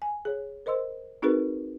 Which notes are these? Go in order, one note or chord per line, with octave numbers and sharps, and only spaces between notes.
G#5
G#4 C#5
A#4 C5 D#5 C6 E6
C4 D#4 F#4 G#4 A#4 B4